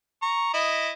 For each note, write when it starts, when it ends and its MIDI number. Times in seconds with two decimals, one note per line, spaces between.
0.22 0.52 82
0.22 0.52 85
0.54 0.91 64
0.54 0.91 75